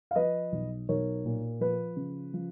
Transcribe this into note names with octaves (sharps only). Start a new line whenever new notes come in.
F5
F3 B4 D#5
B1
B1 A#4 C#5
A#2
F3 B4
C#3
F3